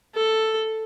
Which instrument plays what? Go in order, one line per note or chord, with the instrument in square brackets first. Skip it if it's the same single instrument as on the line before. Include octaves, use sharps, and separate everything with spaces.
[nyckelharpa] A4